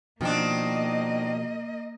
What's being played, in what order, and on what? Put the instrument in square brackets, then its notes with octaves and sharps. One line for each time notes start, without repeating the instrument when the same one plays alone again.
[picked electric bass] B2 F3 [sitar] D#3 C4 D4 [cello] A#3 D#5